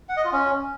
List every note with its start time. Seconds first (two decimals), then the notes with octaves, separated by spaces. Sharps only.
0.09 F#5
0.17 D#5
0.25 F4
0.32 C#4